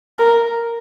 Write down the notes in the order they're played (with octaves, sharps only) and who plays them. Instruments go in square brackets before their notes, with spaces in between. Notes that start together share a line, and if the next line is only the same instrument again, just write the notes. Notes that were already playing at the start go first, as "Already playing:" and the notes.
[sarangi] A#4